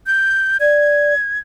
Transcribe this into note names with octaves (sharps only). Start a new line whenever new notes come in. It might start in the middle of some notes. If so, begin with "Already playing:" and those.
G6
D5 G#6